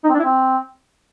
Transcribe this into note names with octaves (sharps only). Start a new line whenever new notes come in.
D#4
C4
D4
E4
C4